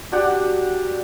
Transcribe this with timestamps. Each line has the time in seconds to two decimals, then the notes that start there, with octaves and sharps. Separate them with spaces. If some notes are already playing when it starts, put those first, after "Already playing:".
0.12 D4 F#4 G4 F#5